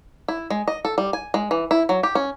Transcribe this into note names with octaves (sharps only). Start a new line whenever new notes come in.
E4
G#3
D#5
A4
G3
G#5
G#3
E3
E4
F#3
G4
C#4